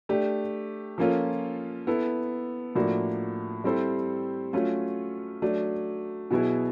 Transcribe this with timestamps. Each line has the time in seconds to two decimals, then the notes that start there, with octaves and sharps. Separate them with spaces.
0.09 A3 D4 G4
0.98 F3 A#3 C#4 F4 A4
1.87 B3 E4 A4
2.75 A2 F3 A#3 D4 F#4
3.64 G3 C4 E4 A4 C5
4.53 F#3 A3 C#4 F4
5.42 F#3 A3 D4
6.31 B2 F#3 B3 E4 G#4